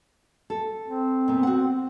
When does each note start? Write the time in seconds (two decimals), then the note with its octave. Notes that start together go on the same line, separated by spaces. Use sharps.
0.50 A4
0.88 C4
1.28 A#2 B3
1.43 F#4 F#5